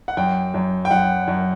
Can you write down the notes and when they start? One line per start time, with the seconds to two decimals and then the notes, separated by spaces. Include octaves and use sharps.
0.08 F#5
0.17 F#2 G5
0.54 F#2
0.85 G5
0.91 F#2 F#5
1.28 F#2